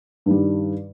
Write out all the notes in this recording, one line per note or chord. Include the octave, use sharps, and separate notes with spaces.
G2 D#3 G3